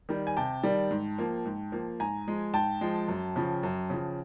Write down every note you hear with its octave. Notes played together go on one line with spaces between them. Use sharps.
D#3 G3
G#5
C3 G5 A5
D#3 G3
G#2
F3 A#3
G#2
F3 A#3
G#2 G#5 A#5
F3 G#3
G#2 G5 A5
F3 G#3
F#2
C#3 F3
F#2
C#3 F3